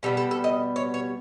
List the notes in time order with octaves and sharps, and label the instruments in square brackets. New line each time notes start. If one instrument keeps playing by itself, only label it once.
[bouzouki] B2 G3 B3 A4
A4
A4
D#5
C#5
C#5